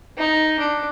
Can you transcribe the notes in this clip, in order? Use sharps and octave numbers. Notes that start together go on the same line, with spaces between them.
D#4
D4